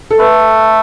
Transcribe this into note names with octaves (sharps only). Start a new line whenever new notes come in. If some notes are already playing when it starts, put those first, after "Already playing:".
A4
A3 B4